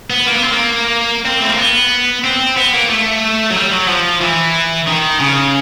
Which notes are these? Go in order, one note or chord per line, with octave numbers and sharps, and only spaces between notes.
B3
A#3
B3
C4
A#3
C4
A3
A#3
B3
C4
B3
A#3
A3
F#3
G3
F#3
F3
E3
D#3
C#3